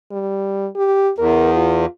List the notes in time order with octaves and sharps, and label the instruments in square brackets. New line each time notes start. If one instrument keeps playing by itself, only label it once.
[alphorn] G3
G4
[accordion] E2 [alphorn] A#4
[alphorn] F4